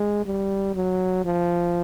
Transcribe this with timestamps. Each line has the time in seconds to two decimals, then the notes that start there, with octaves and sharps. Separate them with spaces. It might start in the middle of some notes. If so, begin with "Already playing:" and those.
Already playing: G#3
0.25 G3
0.75 F#3
1.25 F3